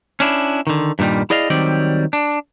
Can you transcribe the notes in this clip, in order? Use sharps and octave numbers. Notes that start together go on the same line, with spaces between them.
C#4 D4 E4
D3 D#3
G2 A#2 D#3 G3
E4 G#4 D5 D#5 F5
D#3 F#3 G3 C4 D5
D4